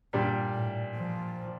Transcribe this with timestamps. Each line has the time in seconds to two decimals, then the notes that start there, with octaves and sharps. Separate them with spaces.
0.13 G2 A#2 G3 D4 G4
0.54 A2
0.95 F3